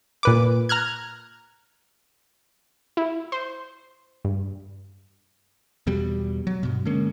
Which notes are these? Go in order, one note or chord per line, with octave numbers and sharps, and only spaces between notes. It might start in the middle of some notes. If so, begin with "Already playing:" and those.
A#2 B4 D6
A#5 F6 F#6 G#6
E4
C5
G2
E2 B2 G3
F#3
G2 B2
D3 G#3 A#3 C#4